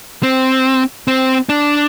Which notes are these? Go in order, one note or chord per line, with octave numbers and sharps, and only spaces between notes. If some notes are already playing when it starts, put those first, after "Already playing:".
C4
C4
D4